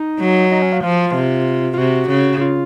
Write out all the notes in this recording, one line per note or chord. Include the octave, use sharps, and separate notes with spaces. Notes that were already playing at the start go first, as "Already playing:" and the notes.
Already playing: D#4
F#3
D#4
C#4
F4
F3 F4
C3
F4
C3 F#4
C#3
F4